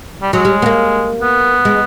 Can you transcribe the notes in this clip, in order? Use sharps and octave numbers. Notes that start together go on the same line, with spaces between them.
G3
F#3 G#3
G3
B3
A#3
B3
G#3